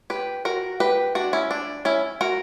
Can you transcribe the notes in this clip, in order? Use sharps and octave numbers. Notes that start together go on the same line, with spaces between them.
G4 B4
F#4 A#4
G4 B4
D4 F#4
C#4 E4
D4
C#4 E4
F#4 A#4